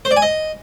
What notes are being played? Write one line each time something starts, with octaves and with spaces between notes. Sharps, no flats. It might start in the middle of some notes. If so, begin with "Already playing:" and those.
C5
D5
G#5
D#5